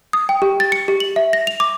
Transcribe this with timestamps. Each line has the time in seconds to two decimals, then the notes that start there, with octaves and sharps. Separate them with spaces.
0.13 D#6
0.29 G5
0.42 G4
0.60 A6
0.72 C#7
0.88 G4
1.00 F#7
1.16 E5
1.33 A#6
1.47 F7
1.60 D6